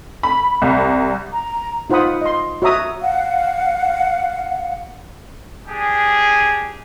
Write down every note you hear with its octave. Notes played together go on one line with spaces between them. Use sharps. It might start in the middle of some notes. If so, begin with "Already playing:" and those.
B5
C2
A#5
D#4 F4 C5 F#5 B5 D#6
D#5 C6
F#4 C#5 E5 A#5 D#6
F5 F#5
D4 G4 G#4